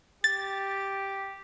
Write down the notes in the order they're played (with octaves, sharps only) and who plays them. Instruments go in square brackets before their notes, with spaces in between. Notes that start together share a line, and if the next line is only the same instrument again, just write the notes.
[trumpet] G4 [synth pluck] A6